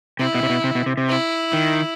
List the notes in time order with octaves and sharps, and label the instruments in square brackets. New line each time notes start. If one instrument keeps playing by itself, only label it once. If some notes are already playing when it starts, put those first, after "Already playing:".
[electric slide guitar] C3 [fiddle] E4
[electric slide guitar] B2
C3
B2
C3
B2
C3
C3
[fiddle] E4
[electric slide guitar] D#3